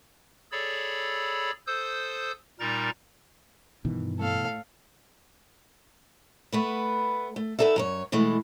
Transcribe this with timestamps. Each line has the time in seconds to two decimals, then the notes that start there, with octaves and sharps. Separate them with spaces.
0.52 G#4 A4 C#5 D5 B5 E6
1.67 A4 C5 D#6 E6 G6
2.60 A#2 G3 D#4 A#4 A#5 A6
3.85 G2 B2 D#3 E3
4.20 A2 A3 A4 F5
6.52 A3 B3 B4
7.36 A3
7.59 B3 D#4 A4 D5 E5
7.76 F#2 A#4 C#5
8.12 B2 E3 G#3 A3